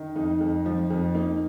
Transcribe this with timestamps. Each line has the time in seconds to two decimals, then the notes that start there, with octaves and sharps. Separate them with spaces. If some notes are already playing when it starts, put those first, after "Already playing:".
Already playing: D#3
0.15 F2 D#4
0.40 F2
0.65 F3
0.90 F2
1.15 A#3 D#4